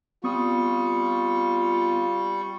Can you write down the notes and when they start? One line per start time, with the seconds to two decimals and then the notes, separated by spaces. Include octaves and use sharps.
0.24 G3 B3 C4 F4 C#6 D#6